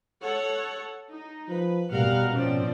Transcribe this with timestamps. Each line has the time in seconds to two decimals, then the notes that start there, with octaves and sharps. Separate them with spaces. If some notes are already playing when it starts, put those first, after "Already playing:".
0.21 A4 C#5 F#5
1.09 D#4
1.49 F3 B4
1.93 B2 G3 A#4 F5 F#5
2.32 F3 C4 C#4 D5